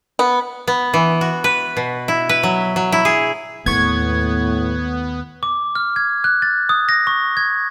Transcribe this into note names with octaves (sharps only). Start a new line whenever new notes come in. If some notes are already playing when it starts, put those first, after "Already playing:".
B3
B3
E3
F#4
B4
B2
E4
B4
F#3
F#3
E4
G#4
D#2 A2 B3 C#6 G#6
D6
F6
G#6
F#6
A6
D#6
A#6
C#6
G#6